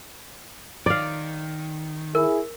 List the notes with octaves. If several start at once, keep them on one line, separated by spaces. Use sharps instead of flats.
D#3 D5 F5
E4 G#4 A#4